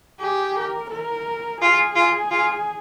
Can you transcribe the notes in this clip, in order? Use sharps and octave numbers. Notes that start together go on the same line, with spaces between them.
G4 G#4
A#4
A#4
F4 G#4
F4
F4